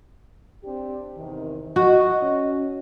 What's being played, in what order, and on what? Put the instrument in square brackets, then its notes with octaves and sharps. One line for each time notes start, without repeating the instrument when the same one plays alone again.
[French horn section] C4 D4 G4
E2 C3 D#3
[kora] F#4 [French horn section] D#5
[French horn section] C#4